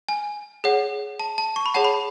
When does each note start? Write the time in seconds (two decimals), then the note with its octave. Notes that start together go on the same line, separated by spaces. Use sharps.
0.09 G#5
0.64 G#4 C#5 F#5
1.19 A5
1.38 A5
1.56 C#6
1.66 B5
1.74 G#4 C#5 F#5 A5
1.84 B5